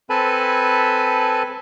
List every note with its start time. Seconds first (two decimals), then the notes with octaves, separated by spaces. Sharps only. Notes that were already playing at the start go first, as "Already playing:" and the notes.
0.10 C4 A4 B4 G#5 A5 B5